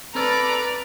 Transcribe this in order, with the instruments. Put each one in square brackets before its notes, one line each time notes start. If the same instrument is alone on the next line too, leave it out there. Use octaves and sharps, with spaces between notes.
[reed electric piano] C4 F6 [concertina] A4 B5 [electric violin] B4 D5 [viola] A#5